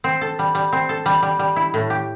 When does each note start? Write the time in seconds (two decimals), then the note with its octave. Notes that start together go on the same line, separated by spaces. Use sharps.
0.04 C4
0.21 A4
0.39 G3
0.55 G3
0.73 C4
0.89 A4
1.06 G3
1.23 G3
1.39 G3
1.56 E4
1.74 A2
1.90 G4